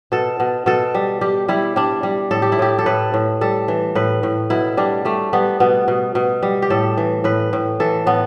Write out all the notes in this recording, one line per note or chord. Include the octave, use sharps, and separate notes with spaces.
B2 A4
B2
B2 A4
G3
G3 G4
G3 E4
G3 D4
G3
A2 A4
G4
E4
A2 G4
A4
A2 B4
A2
G3 A4
E3
A2 B4
A2
B2 E4
G3 D4
G3 A3
G3 B3
B2 B3
B2
B2
G3
G4
A2 A4
E3
A2 B4
A2
E3 A4
A2 B3